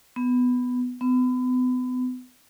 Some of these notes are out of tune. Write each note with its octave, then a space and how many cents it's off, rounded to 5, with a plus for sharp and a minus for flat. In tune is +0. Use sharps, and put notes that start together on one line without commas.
B3 +10
B3 +35